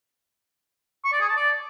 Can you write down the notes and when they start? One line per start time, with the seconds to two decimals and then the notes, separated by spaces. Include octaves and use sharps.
1.04 C#6
1.12 D5
1.21 G#4
1.29 A5
1.37 D5